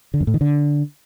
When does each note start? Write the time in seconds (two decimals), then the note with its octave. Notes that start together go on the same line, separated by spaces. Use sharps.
0.14 D3
0.20 F#2
0.27 A2
0.34 D#3
0.41 D3